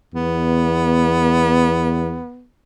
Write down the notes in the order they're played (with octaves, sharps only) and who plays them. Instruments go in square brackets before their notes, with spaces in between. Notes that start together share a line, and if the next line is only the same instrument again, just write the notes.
[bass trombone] E2 [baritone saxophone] B3